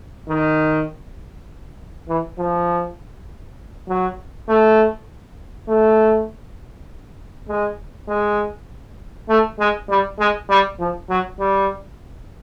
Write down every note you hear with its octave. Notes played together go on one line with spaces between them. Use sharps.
D#3
E3
F3
F#3
A3
A3
G#3
G#3
A3
G#3
G3
G#3
G3
F3
F#3
G3